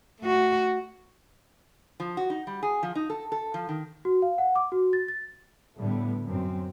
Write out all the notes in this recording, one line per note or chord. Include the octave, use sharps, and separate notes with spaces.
A3 F#4
F3
F#4
D#4
G3
G#4
F3
D#4
A4
A4
F3
D#3
F#4
F5
F#5
D6
F#4
A6
A6
A2 D3 G3 B3
F#2 C4